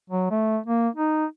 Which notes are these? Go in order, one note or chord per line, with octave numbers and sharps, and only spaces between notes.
F#3
A3
A#3
D#4